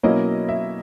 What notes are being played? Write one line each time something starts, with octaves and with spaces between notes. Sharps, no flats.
B2 F#3 A#3 C#4 E4 D#5
E5